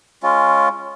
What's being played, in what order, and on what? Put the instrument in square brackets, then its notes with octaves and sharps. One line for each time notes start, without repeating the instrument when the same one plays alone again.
[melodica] G#3 C#4 F4